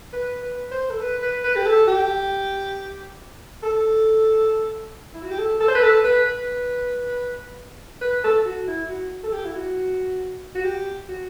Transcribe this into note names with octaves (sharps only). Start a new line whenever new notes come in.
B4
B4
C5
A4
B4
B4
B4
G4
A4
G4
A4
E4
F#4
G4
A4
A4
C5
B4
A4
B4
B4
B4
A4
F#4
E4
F#4
A4
G4
E4
F#4
F#4
G4
F#4